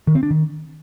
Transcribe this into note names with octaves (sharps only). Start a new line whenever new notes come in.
D#3
C4
D4
D#3